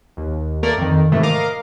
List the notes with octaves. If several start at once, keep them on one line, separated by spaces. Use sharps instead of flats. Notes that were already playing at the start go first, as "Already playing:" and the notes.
D#2
A3 A#3 A#4 D5
F2 D#3
G#2 C3 D#3 E3 A3
A#4 D#5 F5 A#5 D6